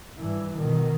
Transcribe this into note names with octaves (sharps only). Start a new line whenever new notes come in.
G2 E3
B2 D#3